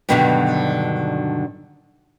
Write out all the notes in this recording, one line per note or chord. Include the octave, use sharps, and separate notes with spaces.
G2 B2 D3 D#3 F#3 G3